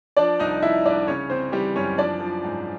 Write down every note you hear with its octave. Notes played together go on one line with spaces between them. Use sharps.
F3 D4 D5
C2 D#4 D#5
F3 E4 E5
C2 D4 D5
C#3 C#4 C#5
C#3 C4 C5
E3 G3 G4
F#2 C#4 C#5
F3 D4 D5
F3
G#2